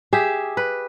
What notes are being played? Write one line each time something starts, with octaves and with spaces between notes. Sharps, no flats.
G4 G#4 E5
B4